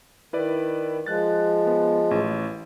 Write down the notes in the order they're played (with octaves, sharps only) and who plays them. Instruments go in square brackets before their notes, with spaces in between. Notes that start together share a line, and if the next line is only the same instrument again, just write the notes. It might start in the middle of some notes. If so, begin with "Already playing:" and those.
[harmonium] D#3 [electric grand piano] E4 B4 D5
[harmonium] F3 G#3 [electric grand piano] F#6 A6
[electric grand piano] B3
A1